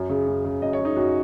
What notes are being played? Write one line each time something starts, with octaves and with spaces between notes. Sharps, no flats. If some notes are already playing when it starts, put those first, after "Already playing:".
Already playing: F#2
C#3
F#2
C#3
F#2 D#5
C#5
C#3
D#4
F#2 F#4